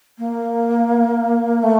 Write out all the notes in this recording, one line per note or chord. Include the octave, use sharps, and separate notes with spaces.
A#3
A3